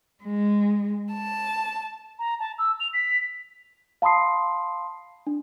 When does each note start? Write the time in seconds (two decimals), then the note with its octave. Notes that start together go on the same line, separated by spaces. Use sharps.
0.23 G#3
1.13 A5
2.19 A#5
2.40 A5
2.59 E6
2.80 F7
2.93 B6
4.02 F5 A5 B5 C6 D#6 C7
5.27 D4